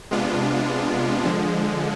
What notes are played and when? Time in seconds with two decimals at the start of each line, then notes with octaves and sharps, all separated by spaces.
0.11 C3 G#3 B3 D4 F4
1.25 D3 F3 G#3